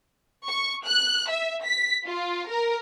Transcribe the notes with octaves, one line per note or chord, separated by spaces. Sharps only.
C#6
F#6
E5
B6
F4
A#4